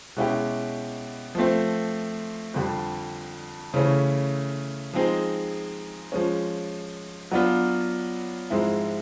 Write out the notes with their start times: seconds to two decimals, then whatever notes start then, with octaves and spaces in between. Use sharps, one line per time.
0.16 B2 G#3 C#4 E4 G4
1.35 F3 A3 C4
2.54 F2 D3 G3
3.74 C#3 E3 A3 C#4
4.93 F3 G#3 C4 D#4 G#4
6.12 F3 G#3 C#4
7.31 F#3 B3 D4 F4
8.50 G#2 F3 G#3 C4 E4